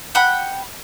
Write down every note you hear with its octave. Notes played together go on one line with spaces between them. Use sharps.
F#5 G5 B5 F#6